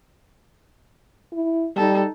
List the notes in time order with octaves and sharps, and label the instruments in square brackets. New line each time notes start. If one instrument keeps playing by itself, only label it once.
[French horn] E4
[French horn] G3 [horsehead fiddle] D#4 A4